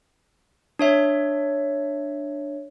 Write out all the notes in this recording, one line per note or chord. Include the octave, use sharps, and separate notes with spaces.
D4 C#5 E5